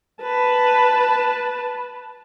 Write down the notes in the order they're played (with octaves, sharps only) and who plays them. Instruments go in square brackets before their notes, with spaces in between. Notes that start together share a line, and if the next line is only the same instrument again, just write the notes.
[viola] B4 A5